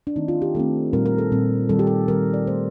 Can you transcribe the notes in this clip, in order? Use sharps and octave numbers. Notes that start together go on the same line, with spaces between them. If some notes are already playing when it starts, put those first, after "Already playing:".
D4
D#3 A3 C4 D#4
F4
G4
D#3 A3 C4 A4
A#2 G3 C4 A#4
A#4
A4
A#2 G3 C4
D#3 G3 C4 A4
G4
A4
D#3 G3 C4 A#4
D5
D#3 A3 C4 C5